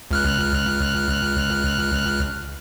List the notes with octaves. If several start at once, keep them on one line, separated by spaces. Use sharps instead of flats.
C#2 F6 F#6